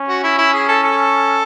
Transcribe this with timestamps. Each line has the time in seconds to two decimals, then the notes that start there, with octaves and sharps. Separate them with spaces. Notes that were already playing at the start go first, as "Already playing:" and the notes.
Already playing: C#4
0.09 F#4
0.24 E4
0.38 E4
0.53 G#4
0.68 A4
0.83 A4